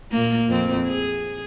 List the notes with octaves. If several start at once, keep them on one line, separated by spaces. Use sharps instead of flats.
A#2 A#3
F2 C4
G#4